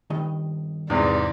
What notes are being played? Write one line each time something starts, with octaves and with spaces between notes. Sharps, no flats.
G2 D#3 D#5
E2 G#2 C3 E3 D5